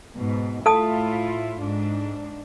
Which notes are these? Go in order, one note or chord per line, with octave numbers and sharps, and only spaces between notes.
G#2 B2
A2 E4 F4 A4 A5 D#6
G#2 D4